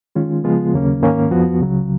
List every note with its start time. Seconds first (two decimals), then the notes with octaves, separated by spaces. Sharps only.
0.15 D#3 G#3 C#4 F4
0.44 C#3 F3 G#3 B3 F4
0.74 D#2 C#3 F#3 A#3 C#4
1.02 G#2 D#3 A#3 C#4
1.31 F2 F3 B3 F#4
1.60 C#2 C#3 F#3